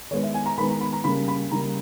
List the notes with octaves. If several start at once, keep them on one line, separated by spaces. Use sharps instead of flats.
D#3 G#3 B3 C#5
E5
G#5
A#5
D#3 G#3 B3 B5
A#5
B5
A#5
C#3 G3 A#3 B5
B5
C#3 G3 A#3 A#5